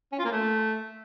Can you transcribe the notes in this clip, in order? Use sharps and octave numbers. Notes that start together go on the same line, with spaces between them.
C#4
F4
A#3
A3